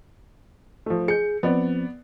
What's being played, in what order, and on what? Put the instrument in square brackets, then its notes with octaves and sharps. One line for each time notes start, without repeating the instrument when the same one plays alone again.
[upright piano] F3 A3
[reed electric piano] G#4 G6 [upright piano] C#7
[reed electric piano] F3 C4 [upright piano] B3 D5